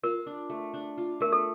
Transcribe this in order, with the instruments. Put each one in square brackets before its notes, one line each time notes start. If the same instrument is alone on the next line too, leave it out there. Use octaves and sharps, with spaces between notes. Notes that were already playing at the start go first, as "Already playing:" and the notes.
[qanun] F4 [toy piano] A#4
[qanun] D4
A3
D4
F4
[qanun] A3 [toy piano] A#4
[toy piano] A4